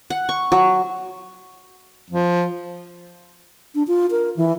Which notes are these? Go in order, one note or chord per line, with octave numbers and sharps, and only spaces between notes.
F#5
C#6
F#3
F3
D4
F4
A#4
E3